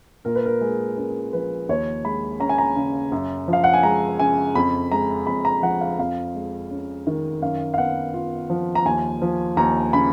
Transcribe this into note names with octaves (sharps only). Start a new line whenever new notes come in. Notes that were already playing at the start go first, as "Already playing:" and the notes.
A#2 A#4
B4
A#4
G#3 G#4
C#4 A#4
F3 B4
D#2 C#5
G#3 B5
C#4 A#5
G#5
A#5
C#3
F#2
F3
F5
F#5
G#5
G#3 A#5
C#3 G#5
F2 B5
G#3 A#5
F2 B5
A#5
F3 F#5
F5
F2 F5
G#3
C#4
D#3
F#2 F5
F5
B3 F#5
F4
F3
A#5
D#2 G#5
F3
D#2 A#5
C#3 B5